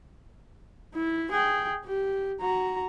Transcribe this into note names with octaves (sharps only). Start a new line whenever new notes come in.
E4
G#4 G5
G4
F#4 A#5